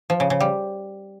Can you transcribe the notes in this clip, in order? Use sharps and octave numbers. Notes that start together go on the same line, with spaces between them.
F3
C#3
C#3
G3